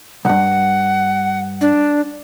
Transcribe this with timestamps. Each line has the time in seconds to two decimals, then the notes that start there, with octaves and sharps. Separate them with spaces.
0.25 B1 G2 F#5
1.61 D4